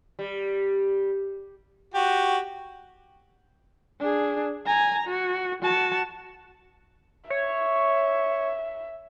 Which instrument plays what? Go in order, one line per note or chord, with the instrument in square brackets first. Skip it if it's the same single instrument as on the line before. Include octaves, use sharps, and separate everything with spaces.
[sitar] G3
[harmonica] F#4 G4
[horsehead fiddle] D4 G#4
G#5 A#5
F#4
F#4 A5
[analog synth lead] C#5 [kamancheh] E5